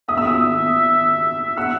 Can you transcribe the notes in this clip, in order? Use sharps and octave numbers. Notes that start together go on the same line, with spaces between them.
E5 D#6
E6
D#6
F#5 E6